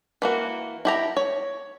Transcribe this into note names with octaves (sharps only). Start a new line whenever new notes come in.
E3 A#3 F#4
E4 G4 A#5
C#5